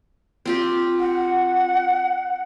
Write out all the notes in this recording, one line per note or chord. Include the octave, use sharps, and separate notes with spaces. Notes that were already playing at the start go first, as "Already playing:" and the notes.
C4 F4 G4
F#5